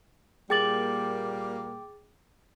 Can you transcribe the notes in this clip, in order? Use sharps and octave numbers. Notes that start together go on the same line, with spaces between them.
A#2 G3 A#3 G#4 G5 D6 A6 F#7